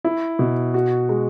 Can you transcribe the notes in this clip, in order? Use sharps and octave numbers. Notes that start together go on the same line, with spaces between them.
E4
B2
F#4
G#3